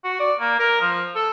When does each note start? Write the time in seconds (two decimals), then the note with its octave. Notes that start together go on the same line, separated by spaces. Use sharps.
0.04 F#4
0.20 D5
0.40 A#3
0.59 A#4
0.81 F3
1.15 A4